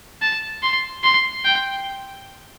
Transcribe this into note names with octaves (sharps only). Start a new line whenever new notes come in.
A5
C6
C6
G5